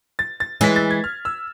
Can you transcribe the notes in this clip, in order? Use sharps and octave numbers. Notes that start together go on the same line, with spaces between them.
A6
A6
E3 G#3 B6
A6
G#6
F6
E6